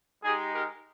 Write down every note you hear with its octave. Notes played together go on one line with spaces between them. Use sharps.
G#3 D#4 G4 G#4
G4 A#4